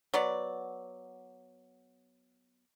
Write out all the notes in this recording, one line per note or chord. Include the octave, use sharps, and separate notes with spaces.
F#3 B3 D5